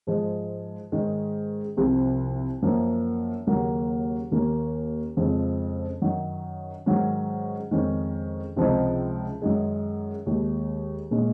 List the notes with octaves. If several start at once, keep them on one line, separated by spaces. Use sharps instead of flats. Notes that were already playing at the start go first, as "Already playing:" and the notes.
G#2 F3 G#3
G#2 D#3 G#3 C#4
C2 C3 F3 C4
F#2 F3 A#3
D#2 C#3 F#3 A#3
D#2 D#3 A#3 C#4
F2 C#3 F3 G#3
F#2 D#3 F#3
G#2 D#3 F#3 C#4
F2 D#3 G#3 C#4
C#2 C3 F3 C4 D#4
F#2 D#3 G#3
D#2 D#3 G#3
A#2 G#3 C#4